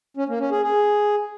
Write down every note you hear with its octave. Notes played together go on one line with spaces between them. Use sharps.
C#4
A#3
C#4
G#4
G#4